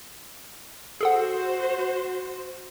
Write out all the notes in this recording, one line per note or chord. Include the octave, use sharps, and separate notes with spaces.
F#4 G#4 A4 C5 F#5